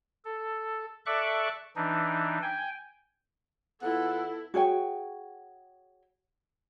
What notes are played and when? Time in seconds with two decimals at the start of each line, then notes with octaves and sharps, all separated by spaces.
0.25 A4
1.06 A4 D5 E5 C#6 D6 F#6
1.76 E3 D4 D#4
2.42 G5 G#5
3.82 E2 B3 E4 F4 A4 F#5
4.54 F#4 G#4 C#5 G5